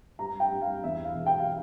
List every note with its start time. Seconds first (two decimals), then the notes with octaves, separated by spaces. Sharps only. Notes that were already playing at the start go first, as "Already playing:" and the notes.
0.19 G2 A#5
0.40 G5
0.51 G2
0.62 F5
0.83 E2 E5
1.05 F5
1.15 E1
1.26 G5
1.39 F5